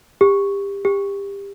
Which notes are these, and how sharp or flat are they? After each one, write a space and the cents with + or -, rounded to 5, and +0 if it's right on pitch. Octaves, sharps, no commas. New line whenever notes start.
G4 +25
G4 +25